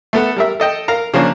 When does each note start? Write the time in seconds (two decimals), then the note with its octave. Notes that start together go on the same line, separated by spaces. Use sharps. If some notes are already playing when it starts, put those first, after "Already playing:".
0.13 A3 B3 A4 F#5
0.36 G3 A#4 E5
0.60 A4 D#5 G5
0.88 A#4 F5 A#5
1.14 C#3 F3 A#3 C#4 D4